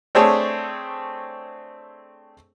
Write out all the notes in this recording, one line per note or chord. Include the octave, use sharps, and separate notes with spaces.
A3 C4 D4 G#4 A4 C#5